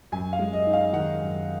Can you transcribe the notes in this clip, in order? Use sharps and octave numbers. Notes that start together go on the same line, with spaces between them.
F#2 G#5
F5
G#3
D#5
D#4
F5
D#3 F#5
F#2